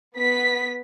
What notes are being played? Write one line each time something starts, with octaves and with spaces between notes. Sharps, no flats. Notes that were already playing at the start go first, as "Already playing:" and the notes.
B3 B6